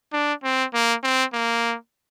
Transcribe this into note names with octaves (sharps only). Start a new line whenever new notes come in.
D4
C4
A#3
C4
A#3